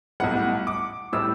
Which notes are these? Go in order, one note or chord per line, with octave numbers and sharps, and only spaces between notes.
B1 A2 G3 F#5
D6
A2 G3 E6